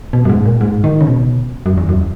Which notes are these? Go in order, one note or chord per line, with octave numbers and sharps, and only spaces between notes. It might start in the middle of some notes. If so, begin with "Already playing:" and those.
B2
F#2
G#2
A#2
G#2
D#3
C#3
B2
F#2
E2
F#2